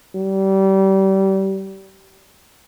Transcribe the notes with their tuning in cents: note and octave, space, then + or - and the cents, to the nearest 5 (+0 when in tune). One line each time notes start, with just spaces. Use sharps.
G3 -25